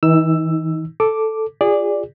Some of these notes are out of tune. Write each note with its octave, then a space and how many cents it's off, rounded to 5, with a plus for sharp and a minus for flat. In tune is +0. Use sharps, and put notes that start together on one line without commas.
E3 -35 D#4 +20 E6 +10
A4 +0 D6 +0
F4 +10 G#4 -25 D5 +0